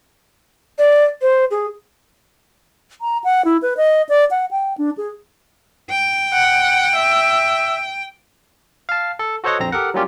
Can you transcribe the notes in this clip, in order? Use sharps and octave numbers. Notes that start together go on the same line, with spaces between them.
D5
C5
G#4
A#5
F#5
E4
B4
D#5
D5
F#5
G5
D4
G#4
G5
F#5
E5
F5 A5
A4
F#4 A4 C5 C#5 D#5 F#5
A#1 F2 C4 A#5 A#6
G4 A4 A#4 F#5
F#3 G3 A#3 C#4 F4 G4